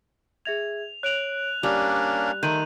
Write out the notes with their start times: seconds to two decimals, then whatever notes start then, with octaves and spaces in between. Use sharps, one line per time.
0.45 G#4 E5 G#6 F7
1.03 C#5 F#6 D7 F7 F#7
1.63 G3 A#3 C#4 D4 D6
2.43 D#3 A3 A#5 C6 G6 D#7 F#7